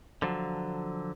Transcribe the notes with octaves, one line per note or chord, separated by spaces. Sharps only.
D3 F3 F#3